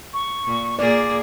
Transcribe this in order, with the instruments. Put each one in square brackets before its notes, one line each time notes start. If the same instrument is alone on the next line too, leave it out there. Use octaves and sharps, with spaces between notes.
[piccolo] C#6
[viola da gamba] A#2
[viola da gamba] A#2 A#3 G#4 [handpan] D5 [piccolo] D6